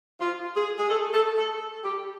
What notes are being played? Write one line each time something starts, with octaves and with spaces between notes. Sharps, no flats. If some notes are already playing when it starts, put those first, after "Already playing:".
F4
G#4
G#4
A4
A4
A4
G4